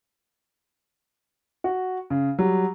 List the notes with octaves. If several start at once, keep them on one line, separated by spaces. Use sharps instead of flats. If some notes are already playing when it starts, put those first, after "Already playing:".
F#4
C#3
F#3 G3